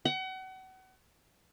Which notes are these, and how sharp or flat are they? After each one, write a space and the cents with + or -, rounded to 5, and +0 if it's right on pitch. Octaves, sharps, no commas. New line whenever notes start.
F#5 +35